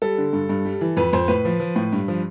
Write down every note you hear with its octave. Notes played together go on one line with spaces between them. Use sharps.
G3 A4
D3
G2
G2
G3
E3
F2 B4
F2 C5
A2 B4
F3
F3
A2
G2
F3